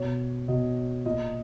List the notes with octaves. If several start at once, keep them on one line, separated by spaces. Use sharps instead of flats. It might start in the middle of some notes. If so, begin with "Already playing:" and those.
Already playing: B2 C#5
B2 D#5
A#2 D#5